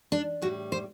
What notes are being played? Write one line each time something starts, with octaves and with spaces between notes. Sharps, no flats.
D4
A2 G3 F#4
C5